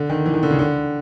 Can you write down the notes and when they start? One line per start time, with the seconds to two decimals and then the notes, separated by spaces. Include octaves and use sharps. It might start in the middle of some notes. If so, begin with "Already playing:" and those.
Already playing: D3
0.09 D#3
0.26 E3
0.34 D#3
0.43 D3
0.51 C#3
0.59 D3